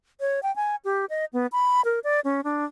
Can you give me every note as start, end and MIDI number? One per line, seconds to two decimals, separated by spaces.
0.21 0.40 73
0.43 0.54 79
0.56 0.76 80
0.85 1.05 67
1.10 1.25 75
1.33 1.47 59
1.52 1.81 83
1.85 1.99 70
2.04 2.20 74
2.24 2.41 61
2.44 2.65 62